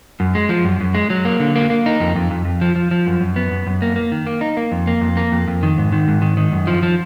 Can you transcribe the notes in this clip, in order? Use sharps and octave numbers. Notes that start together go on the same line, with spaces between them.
F#2
G#3
F3
F#2
F#2
G#3
F#3
A#3
D3
A#3
A#3
D#4
F2
F2
F2
F2
F3
F3
F3
F#2
F#2
B3
F#2
F#2
A#3
A#3
D#3
A#3
D#4
A#3
F2
A#3
F2
A#3
F2
F2
D#3
G#2
D#3
G#2
D#3
D#3
F#2
F3
F3